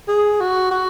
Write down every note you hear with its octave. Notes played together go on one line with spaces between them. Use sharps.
G#4
F#4
F#4